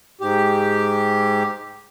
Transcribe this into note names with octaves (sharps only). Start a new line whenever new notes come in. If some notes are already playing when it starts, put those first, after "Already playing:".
G#2 G4